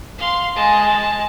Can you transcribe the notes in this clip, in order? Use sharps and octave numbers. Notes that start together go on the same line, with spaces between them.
F5 C6
G#3 A5